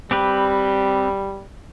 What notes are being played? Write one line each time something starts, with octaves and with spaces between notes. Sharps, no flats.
G3 C4 G4 B4